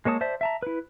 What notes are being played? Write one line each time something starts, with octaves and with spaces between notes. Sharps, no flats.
G#3 A#3 C#5 A5 D#6
C5 D5 E5 A5
E5 A5 A#5
E4 B4